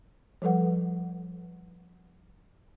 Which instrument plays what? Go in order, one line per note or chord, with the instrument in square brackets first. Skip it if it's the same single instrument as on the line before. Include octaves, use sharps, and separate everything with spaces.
[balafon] F3 G3 A4 B4 F#5